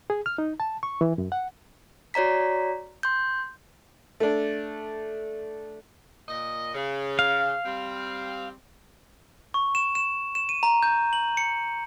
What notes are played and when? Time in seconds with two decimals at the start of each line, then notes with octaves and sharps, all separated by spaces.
0.10 G#4
0.26 F6
0.38 D#4
0.60 A5
0.83 C#6
1.01 E3
1.18 F#2
1.32 F#5
2.14 F#4 C#5 D5 A#5 B6
3.03 C6 G6
4.20 A3 D4
6.29 A#2 D#5
6.74 C#3
7.19 F5
7.65 G3 C4
9.54 C#6
9.75 E7
9.95 E7
10.35 E7
10.49 D#7
10.63 A#5
10.83 G6
11.13 F#7
11.37 C#7